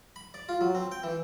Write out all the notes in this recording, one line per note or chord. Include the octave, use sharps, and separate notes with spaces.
B5
D5
F4
F#3
C4
G5
E3